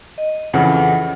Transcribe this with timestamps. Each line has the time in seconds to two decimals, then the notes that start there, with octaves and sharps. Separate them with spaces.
0.18 D#5
0.53 F2 C#3 E3 F#5